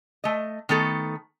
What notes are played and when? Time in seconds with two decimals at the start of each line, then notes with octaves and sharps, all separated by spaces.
0.24 A3 D#5
0.69 D#3 A3 B3 A4